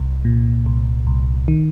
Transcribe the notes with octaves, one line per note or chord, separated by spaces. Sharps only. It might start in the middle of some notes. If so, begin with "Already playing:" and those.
Already playing: C2
A#2
C2
C2
D#3